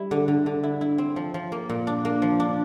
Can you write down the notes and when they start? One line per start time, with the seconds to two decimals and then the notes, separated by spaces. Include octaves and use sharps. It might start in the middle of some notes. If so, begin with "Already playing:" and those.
Already playing: G3 E4
0.11 D3
0.28 D3
0.46 D3
0.63 E4
0.81 E4
0.98 C4
1.16 F3
1.34 F3
1.52 A#3
1.69 A#2
1.87 D4
2.05 A#3
2.22 F3
2.40 D4